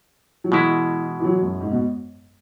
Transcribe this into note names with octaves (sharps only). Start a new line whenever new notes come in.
F#3
B2 E3 G#3 E4
E3
F#3
F#2
G#2
B2